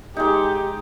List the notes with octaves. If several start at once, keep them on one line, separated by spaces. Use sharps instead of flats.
G#3 D#4 G4